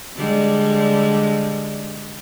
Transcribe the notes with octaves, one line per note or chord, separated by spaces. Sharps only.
D3 G3 G#3